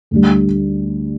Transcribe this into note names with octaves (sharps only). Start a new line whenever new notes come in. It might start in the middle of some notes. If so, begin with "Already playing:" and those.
D2 D3 G3